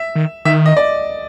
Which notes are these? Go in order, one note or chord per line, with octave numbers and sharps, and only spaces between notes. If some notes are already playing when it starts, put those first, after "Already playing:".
Already playing: E5
D#3
D#3 E5
D#5
D5